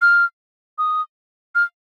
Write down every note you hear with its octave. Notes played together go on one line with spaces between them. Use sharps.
F6
D#6
F6